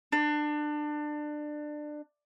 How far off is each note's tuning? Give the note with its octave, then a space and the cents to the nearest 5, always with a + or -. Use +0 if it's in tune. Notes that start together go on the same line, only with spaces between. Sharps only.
D4 +25